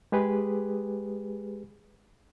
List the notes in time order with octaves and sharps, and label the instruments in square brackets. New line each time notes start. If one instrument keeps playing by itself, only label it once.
[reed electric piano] G#3 G4 G#4 B4